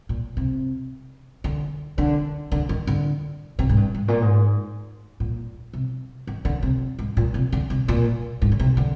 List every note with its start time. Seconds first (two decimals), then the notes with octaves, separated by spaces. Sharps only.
0.09 A#2
0.37 C3
1.44 D3
1.98 D3
2.52 D3
2.69 D#3
2.87 D3
3.59 C3
3.69 G#2
3.77 G2
3.95 G#2
4.08 A#2
4.22 G#2
5.20 A#2
5.73 C3
6.27 D#3
6.45 D3
6.63 C3
6.99 G#2
7.17 A#2
7.34 C3
7.52 D3
7.70 C3
7.88 A#2
8.42 G#2
8.52 D3
8.59 C3
8.77 D3